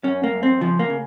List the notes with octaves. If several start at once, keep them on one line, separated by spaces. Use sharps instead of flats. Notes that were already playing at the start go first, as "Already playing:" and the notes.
F#2 C#4
A#3
F#2
C4
C#3 F3
A#3
C#3